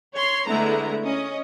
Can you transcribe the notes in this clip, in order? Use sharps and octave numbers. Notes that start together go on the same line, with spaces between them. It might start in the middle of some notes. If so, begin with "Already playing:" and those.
C#5 C6
D3 G#3 A3 B3 E4 A#5
C#4 D#5